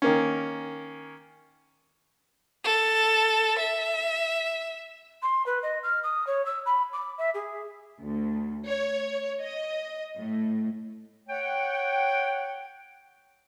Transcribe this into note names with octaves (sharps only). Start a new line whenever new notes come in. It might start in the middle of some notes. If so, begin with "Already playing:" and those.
D#3 A#3 C#4
A4
E5
C6
B4
D#5
F6
D#6
C#5
E6
B5
D6
E5
G#4
D2
C#5
D#5
A2
C#5 F#5 G5